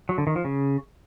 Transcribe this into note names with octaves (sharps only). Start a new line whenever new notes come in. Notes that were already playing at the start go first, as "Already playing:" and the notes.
F#3
D3
D#3
F3
C#3